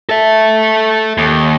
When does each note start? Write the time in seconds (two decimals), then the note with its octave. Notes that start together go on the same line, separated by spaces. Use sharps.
0.09 A4 E5
1.18 D#2